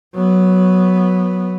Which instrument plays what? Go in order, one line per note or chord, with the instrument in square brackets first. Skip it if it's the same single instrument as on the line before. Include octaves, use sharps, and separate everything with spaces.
[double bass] F#3 B3